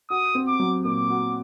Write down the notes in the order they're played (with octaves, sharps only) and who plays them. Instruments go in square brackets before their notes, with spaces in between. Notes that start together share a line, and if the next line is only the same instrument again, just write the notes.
[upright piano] F#4 [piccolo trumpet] D#6
[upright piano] C4
[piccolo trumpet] D6
[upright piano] F#3
[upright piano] A#2 [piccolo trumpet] D6
[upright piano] F#4